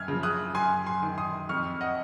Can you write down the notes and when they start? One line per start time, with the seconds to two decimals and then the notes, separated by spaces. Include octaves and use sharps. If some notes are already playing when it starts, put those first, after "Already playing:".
Already playing: F#2 F6 G#6
0.08 C#3 F3
0.23 D#6 F#6
0.55 F#2 G#5 C6
0.86 G#5 C6
1.03 D#3
1.18 C6 D#6
1.49 F2 C#6 F6
1.81 D#5 F#5